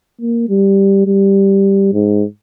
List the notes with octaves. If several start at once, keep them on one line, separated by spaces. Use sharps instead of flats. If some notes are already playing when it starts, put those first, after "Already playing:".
A#3
G3
G3
G#2